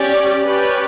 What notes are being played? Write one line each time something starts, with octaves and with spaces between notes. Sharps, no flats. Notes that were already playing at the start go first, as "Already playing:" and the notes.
Already playing: C#4 G4 D5
C#4 G4 B4 D5